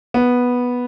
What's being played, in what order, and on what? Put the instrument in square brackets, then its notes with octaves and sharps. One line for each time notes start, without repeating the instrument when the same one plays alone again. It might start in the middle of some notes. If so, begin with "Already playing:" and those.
[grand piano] B3